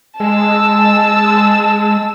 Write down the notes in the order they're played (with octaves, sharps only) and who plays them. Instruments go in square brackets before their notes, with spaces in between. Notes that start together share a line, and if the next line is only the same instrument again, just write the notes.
[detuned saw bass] G#3 [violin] A5 E6